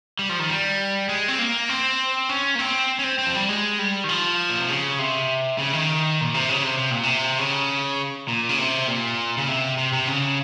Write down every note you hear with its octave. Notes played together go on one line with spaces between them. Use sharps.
G3
F3
D#3
G3
G#3
C4
A#3
C4
C#4
A#3
C4
C#4
C4
C4
F3
G3
G#3
G3
D#3
F3
A#2
C3
C#3
C3
C#3
D#3
A#2
C3
C#3
C3
C3
A#2
C3
C#3
A#2
C#3
C3
A#2
C#3
C3
C3
C3
C#3